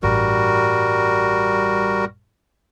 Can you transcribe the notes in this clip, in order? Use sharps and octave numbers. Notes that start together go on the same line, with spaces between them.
A1 G2 G3 F#4 A#4